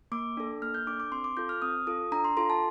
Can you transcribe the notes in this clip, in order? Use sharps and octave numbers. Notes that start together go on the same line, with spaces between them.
A#3 D6
D4 A4
A#3 F6
G6
D4 A4 D6
D6
C4 C6
D6
F4 A4 G6
F6
C4 D#6
F4 A4 D#6
D4 A#5
C6
F4 A4 C6
A5